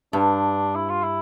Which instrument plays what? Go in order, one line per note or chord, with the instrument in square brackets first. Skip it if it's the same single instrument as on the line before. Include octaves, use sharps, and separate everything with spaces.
[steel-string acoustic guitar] G2 [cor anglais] D4
[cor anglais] E4
F4
E4